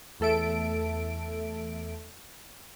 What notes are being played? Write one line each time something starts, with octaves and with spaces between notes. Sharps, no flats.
E2 A3 A4 E5 D7